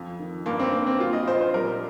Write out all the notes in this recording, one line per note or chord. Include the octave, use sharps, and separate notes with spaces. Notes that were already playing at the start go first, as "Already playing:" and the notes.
Already playing: F2
D#3
G2 A#3
C4
G2 A#3
C4
A#2 F4
D#5
A#1 C5
C5
G3 A#4